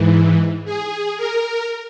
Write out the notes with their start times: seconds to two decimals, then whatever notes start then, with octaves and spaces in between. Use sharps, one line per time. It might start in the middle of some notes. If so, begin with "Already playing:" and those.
Already playing: G#2 E3
0.65 G#4
1.17 A#4